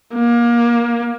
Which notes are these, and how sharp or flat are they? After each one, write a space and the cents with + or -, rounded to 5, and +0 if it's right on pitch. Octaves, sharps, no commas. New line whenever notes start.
A#3 +25